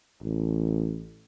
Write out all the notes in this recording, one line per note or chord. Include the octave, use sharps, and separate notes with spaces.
A1